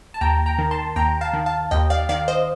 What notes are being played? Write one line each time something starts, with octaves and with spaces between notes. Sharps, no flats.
A5
D#2 G5 A#5
G5 A#5
D#3
A5 C6
D#2 G5 A#5
F5 A5
D#3
F5 A5
D#2 D#5 G5
D5 F5
D#3 D5 F5
C5 D#5